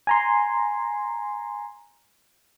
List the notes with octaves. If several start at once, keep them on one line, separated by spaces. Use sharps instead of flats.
G#5 A#5 C6